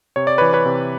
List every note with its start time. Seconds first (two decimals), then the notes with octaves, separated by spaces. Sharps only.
0.16 C3 C#5
0.27 D5
0.38 E3 B4 C#5
0.53 B4 C#5
0.66 C3